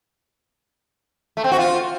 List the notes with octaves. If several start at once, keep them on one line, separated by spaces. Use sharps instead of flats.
A3
C4
F#4
F4